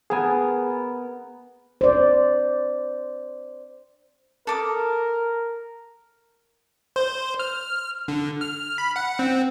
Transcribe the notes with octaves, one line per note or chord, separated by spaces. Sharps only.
B3 G#4 A#4 G#5 A5
C5 D5
A4 A#4 D6 D#6
C5
F6
D3
F6
B5
F#5
C4